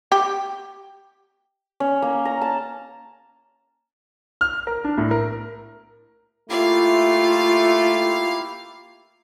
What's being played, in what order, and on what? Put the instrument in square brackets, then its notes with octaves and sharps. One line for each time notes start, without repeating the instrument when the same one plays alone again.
[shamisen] G4
[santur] C#4
A#3
A#5
A5
[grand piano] F6
A#4
D4
A2
A#4
[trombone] A3 [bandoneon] A#3 E4 G4 [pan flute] F4 [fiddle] F5